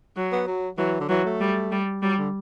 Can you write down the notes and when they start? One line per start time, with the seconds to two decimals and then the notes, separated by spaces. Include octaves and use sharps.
0.17 F#3
0.32 B3
0.47 F#3
0.78 E3 F#3
1.00 D3
1.09 E3 F#3
1.25 A3
1.40 G3
1.71 G3
2.02 F#3 G3
2.18 D3